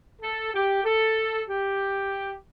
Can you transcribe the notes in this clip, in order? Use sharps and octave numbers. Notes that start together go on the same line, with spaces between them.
A4
G4
A4
G4